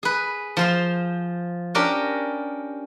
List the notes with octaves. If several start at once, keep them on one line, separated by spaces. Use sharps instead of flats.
G#4 B4
F3 C5 F5
C#4 D4 G4 A#4